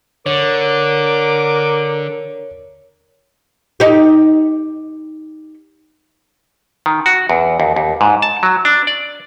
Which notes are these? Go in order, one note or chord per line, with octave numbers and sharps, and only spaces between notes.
D3 A#4 C#5 D6
D#4 G4
D#3
F#4
E2
D#2
D#2
G#2
A5
F#3
D4
D5